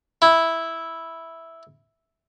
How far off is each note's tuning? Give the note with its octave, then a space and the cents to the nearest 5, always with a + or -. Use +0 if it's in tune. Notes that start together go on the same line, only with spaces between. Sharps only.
E4 -5